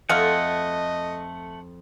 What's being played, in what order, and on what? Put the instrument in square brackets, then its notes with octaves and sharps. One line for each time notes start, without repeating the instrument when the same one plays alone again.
[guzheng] F2 [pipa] G#3 A3 F5 [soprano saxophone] D#5 [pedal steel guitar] F#5